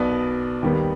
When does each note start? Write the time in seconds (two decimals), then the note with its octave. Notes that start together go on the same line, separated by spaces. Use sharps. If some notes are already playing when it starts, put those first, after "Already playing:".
Already playing: B1 B2 B3 D5
0.63 D#2 D#3 G3 B3